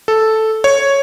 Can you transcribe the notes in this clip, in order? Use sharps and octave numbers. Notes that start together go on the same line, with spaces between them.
A4
C#5